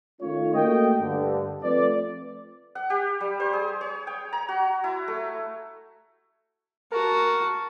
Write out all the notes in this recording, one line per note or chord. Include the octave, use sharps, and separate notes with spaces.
D#3 A3 C#4 F4 C#5
A3 A#3 F#4 A#4 D#5 G5
G2 D3
F3 A3 C4 B4 D5
F#5
G4
G3
C5
G#4
C#5
G5
A#5
F#4
E4
A3
F#4 A#4 A5